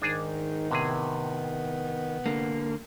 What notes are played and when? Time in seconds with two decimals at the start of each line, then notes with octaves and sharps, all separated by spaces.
0.02 G#2 D#3 D4 G#4
0.71 A2 C3 B3 G#4
2.26 D3 A#3